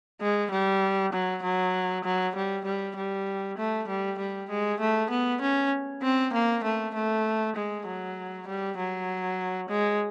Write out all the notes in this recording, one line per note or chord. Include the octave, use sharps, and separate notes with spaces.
G#3
G3
F#3
F#3
F#3
G3
G3
G3
A3
G3
G3
G#3
A3
B3
C#4
C4
A#3
A3
A3
G#3
F#3
G3
F#3
G#3